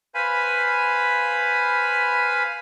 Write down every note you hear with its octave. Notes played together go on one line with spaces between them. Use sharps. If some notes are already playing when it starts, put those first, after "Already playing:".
B4 C5 F5 G#5 B5